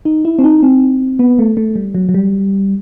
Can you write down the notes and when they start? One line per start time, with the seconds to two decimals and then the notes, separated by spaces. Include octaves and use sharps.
0.05 D#4
0.25 E4
0.39 C4
0.44 D#4
0.63 C4
1.19 B3
1.39 A3
1.57 A3
1.76 G3
1.95 F#3
2.09 F#3
2.14 G3